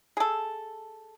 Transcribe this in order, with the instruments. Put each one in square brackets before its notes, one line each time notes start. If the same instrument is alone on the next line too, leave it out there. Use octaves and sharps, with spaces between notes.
[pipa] G#4 A4